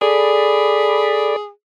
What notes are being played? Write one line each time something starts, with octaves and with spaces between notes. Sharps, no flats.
G#4 A4 D5 B5